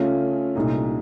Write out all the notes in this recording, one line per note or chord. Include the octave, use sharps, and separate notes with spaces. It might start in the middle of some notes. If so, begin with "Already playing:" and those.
Already playing: C#3 A3 C#4 F4
C2 A#2 A3 D#4